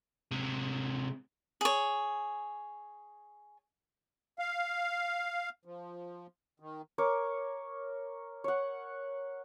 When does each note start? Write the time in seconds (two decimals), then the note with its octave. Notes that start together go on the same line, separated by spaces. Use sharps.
0.31 C3 G#3
1.61 G#4 C#5
4.39 F5
5.65 F3
6.60 D#3
6.98 A#4 C#5 D6
8.44 C#5 F#5